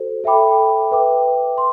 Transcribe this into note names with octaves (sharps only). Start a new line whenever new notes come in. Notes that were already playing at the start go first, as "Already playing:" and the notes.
Already playing: F#4 A4 C5
A4 E5 G5 B5 D6
B4 E5 G5 D6
C6